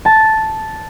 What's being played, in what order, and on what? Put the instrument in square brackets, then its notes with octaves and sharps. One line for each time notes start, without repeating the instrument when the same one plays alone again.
[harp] A5